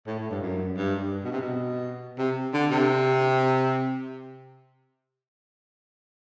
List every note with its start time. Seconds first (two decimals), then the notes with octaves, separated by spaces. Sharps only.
0.07 A2
0.19 A2
0.31 G2
0.42 F#2
0.77 G2
1.01 G2
1.24 B2
1.32 C3
1.41 B2
2.18 C3
2.54 D3
2.71 C3